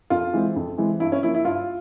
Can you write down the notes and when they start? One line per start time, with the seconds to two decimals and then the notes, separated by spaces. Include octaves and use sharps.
0.10 F2 F4
0.33 E3 G#3 C4
0.56 F2
0.77 E3 G#3 C4
1.00 G2 E4
1.12 C#4
1.23 F3 A#3 E4
1.35 E4
1.45 G2 F4